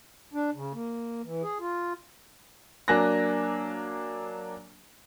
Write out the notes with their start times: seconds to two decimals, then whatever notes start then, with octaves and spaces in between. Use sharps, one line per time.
0.34 D4
0.55 C#3
0.74 A#3
1.24 E3
1.43 G#4
1.60 F4
2.88 F#3 A#3 D4 G#5 F#6 A#6